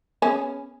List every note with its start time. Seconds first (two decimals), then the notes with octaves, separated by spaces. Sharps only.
0.22 B3 C#4 G#4